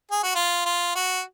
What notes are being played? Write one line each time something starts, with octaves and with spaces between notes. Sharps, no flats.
G#4
F#4
F4
F4
F#4